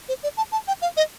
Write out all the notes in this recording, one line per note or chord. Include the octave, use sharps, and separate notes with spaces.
C5
D5
A5
A5
G5
F5
D#5